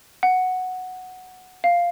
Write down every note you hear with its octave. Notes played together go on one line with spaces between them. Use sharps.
F#5
F5